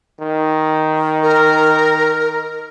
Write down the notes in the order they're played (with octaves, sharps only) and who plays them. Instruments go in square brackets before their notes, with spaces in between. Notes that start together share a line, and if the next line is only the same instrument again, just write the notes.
[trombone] D#3
[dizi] A#4